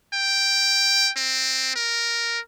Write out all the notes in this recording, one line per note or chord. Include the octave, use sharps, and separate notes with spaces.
G5
C4
A#4